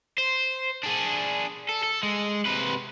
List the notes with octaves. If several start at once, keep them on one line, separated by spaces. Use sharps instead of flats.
C5
D4 G#4
A4
A4
G#3
C3 B4